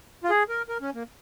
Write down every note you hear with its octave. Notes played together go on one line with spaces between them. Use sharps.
F4
G#4
A#4
A#4
C#4
A#3